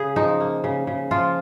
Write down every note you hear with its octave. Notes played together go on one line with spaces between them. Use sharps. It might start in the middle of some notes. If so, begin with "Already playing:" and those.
Already playing: C#3 G#4
F3 D#4
A#3
C#3
C#3
F3 F4